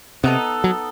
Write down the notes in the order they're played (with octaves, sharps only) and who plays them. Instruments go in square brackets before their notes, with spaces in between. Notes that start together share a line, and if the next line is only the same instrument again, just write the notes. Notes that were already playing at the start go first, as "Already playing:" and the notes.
[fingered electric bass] C3 [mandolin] B3 D#4 A4
[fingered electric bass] F#3